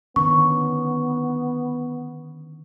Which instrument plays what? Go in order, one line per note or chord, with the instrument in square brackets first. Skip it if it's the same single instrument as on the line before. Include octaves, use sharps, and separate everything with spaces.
[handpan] D3 D#3 C#4 [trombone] B3 [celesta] C#6